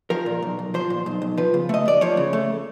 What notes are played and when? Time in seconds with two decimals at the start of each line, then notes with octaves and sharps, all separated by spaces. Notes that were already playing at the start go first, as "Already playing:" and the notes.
0.10 F3 A#4
0.26 A#2
0.42 B1
0.59 B1
0.74 F3 C5
0.90 A#2
1.06 B1
1.22 B1
1.37 F3 B4
1.54 C#3
1.69 A3 D#5
1.86 D#2 D5
2.01 F3 C#5
2.17 C#3
2.33 A3